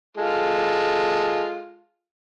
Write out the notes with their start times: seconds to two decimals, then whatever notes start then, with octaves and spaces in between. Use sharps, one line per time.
0.17 G#3 F4 A4